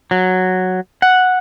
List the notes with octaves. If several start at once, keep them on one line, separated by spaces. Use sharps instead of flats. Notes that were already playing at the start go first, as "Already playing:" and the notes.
F#3
F#5